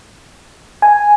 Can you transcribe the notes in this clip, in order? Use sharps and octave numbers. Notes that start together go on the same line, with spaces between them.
G#5